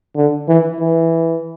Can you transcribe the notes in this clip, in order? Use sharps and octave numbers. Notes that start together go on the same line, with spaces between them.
D3
E3
E3